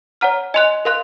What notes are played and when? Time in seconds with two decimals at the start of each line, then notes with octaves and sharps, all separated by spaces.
0.21 C#5 F#5 A#5 F6
0.54 D#5 G#5 C6 F#6
0.85 A#4 F5 C6 F#6